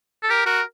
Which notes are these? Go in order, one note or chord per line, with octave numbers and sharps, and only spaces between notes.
A4
G4 A#4
F#4 A#4